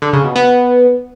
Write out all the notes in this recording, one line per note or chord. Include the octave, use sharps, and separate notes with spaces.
D3
C#3
B2
B3